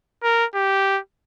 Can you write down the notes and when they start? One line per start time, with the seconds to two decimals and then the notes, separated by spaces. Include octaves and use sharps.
0.23 A#4
0.55 G4